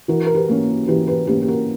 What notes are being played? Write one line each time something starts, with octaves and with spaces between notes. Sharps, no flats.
E3 F#4 A#4
A#4
G4 B4
A#3 C#4
E3 G4 B4
G4 B4
A#3 C#4 G4 B4
G4
F#4 A#4